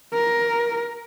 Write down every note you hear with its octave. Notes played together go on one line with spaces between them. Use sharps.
A#4